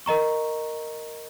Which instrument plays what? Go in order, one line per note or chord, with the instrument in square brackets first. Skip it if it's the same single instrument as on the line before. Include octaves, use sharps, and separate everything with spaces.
[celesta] A#4 D#5 A#5 C#6